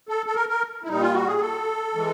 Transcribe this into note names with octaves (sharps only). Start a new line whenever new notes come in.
A4
A4
A#4
A#4
E4
A#2 G3 D#4
F4
F#4
G#4
A4
E3 G#3